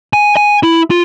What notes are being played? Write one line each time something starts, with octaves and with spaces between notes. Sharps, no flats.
G#5
G#5
E4
F4